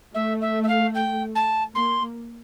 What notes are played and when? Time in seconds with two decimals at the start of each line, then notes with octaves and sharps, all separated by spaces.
0.14 A3 E5
0.41 E5
0.63 E5
0.68 F5
0.94 G5
1.35 A5
1.75 A#3 C6